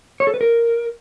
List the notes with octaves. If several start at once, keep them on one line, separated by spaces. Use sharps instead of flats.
C#5
A4
B4
A#4